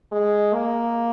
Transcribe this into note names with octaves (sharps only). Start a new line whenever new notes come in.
G#3
A#3